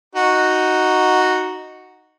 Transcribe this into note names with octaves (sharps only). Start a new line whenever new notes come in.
D#4 F#4